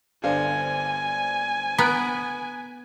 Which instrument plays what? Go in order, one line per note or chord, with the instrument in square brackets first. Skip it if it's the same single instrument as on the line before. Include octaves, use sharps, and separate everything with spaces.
[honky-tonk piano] G1 D4 C5 [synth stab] F5 [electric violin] G#5
[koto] B3 [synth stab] A#5 F#6 D7